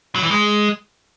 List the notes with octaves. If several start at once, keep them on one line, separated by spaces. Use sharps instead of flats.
F#3
E3
G#3